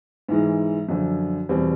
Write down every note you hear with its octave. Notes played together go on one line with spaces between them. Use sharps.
G#2 E3 G#3
F#2 D3 F3
E2 B2 G3 C4